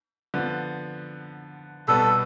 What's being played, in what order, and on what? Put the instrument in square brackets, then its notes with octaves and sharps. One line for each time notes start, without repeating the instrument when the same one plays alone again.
[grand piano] D3 F3 B3
[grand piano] C2 B2 G3 B3 [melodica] A4